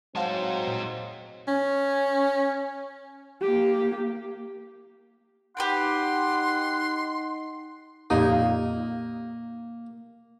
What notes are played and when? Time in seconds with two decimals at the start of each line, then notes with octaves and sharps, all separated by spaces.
0.16 F#3 G#3 C4 C5 F5 F#5 A5
0.67 A#2
1.48 C#4
3.42 A#3 G4
5.57 D#4 G4 B4 F#5 G5 C6
8.10 F2 A#2 A#3 D#4 G4 D#5 F5